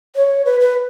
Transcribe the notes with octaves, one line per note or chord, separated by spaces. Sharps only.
C#5
B4
B4